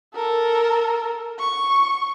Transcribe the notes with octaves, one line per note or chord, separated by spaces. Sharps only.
A4 A#4
C#6